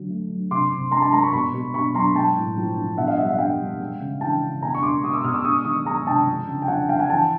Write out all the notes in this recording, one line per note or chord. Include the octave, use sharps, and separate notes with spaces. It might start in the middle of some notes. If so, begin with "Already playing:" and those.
Already playing: D3 F#3
A3
F#3
C3 C6 D6
C3
G#3 A#5 C6
A5 B5
G#3 A#5 C6
B5 C#6
B2 B5 C#6
B2
B2 B5 C#6
F#3 A#5 C6
G#3 G5 A5
A2
F3
F3
B2 E5 F#5
D#5 F5
G3 E5 F#5
E5 F#5
G3 F5 G5
G3
G#3
C#3
E3 G5 A5
C#3
B2 G#5 A#5
C#6
G#3 C6 D6
B2 C#6 D#6
D6 E6
B2 D#6 F6
D6 E6
G#3 C#6 D#6
D#3 C#6 D#6
G#3 G#5 A#5
C3 G5 A5
F3
C#3
G5
F3 F#5 G#5
F3 F5 G5
F#5 G#5
E3 G5 A5